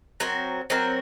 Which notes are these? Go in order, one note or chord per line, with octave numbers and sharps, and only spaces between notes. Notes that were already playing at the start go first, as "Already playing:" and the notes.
F#3 C4 F#4 A#4
F#3 C4 F#4 A#4